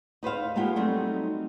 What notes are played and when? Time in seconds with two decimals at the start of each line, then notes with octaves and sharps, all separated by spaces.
0.23 D#4 B4 C5 F5
0.56 G#3 A#3 B3 F4 G4
0.76 F#3 G3 A3 C4 D#4